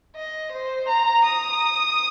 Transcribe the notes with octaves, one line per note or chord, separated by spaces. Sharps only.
D#5
C5
A#5
D#6